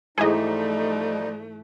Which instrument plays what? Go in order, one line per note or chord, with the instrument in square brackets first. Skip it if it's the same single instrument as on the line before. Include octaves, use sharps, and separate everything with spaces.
[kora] G#2 E3 [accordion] F3 G3 D#4 [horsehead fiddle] A3 [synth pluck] G#4 D#5